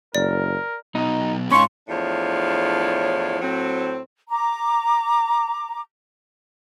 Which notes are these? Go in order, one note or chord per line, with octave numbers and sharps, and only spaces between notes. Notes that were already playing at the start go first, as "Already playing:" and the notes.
F#1 A#4 D5
B1 B2 D#4
G#2 C#4 F4 C6 C#6
E2 A2 F3 D4 C#5
A2 F#3 C4
A#5 D6